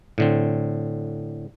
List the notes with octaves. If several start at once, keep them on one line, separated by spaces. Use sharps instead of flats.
A2 D3 C4